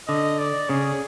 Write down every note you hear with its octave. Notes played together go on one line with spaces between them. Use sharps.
D3 D#5
D5
C#3 G#4